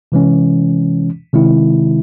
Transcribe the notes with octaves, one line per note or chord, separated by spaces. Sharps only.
C3 E3 G#3 C#4
C3 D#3 G#3 C4 E4